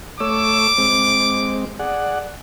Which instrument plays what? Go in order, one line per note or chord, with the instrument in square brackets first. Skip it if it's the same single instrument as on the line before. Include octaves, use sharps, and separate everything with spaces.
[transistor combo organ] A3 C#5 E6 [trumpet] D6
[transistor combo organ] G#3 C4
G#4 D5 F#5